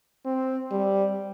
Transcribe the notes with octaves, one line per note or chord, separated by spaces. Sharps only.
C4
G3